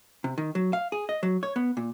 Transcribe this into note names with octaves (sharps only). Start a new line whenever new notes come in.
C3
D#3
F#3
F5
G#4
D#5
F#3
C#5
B3
A#2